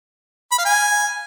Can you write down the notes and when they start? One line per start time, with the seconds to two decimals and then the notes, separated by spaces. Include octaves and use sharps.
0.52 B5
0.58 F5
0.65 G#5